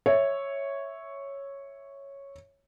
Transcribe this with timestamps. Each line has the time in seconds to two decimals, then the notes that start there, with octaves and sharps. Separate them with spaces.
0.06 C#5 E5